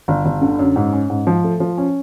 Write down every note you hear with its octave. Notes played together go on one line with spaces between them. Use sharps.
G1
G1
D3
F#2
G#2
C#4
G#2
F3
A3
F3
C#4